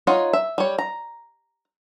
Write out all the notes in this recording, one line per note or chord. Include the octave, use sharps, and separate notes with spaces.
D#4 F4 C#5 F#5
E5
G3 C#5
A#5